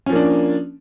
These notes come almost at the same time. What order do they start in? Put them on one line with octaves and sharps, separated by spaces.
C#4 F3 A#3 D4